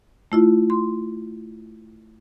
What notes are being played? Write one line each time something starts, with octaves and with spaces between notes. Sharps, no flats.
A3 E4 F4
C6